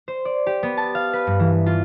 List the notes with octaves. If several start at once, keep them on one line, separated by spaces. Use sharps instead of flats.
C5
D5
G4
B3
A5
F5
B4
G2
E3
F4